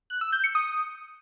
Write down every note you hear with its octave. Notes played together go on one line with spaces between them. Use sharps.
F#6
E6
G6
C#7
D#6